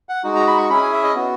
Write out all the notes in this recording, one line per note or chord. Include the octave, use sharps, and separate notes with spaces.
F#5
G#3 D#4 F#4
A#5
B5
C#6
C#4 E4 G#4 B5
G#5
E5
D#5
B3 F#4